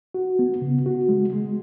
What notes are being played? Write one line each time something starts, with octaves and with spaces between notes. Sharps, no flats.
F#4
B3
C#3
F#4
G#3
G#3